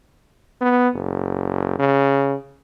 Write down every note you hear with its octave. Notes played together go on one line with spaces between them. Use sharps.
B3
F#1
C#3